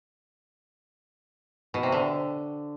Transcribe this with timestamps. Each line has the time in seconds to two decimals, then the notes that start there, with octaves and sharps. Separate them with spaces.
1.74 B2
1.83 C3
1.92 D3